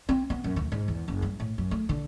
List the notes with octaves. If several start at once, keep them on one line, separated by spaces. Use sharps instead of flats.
C4
B3
F#2
D2
G#2
E2
F#1
G2
A2
F#2
A3
D3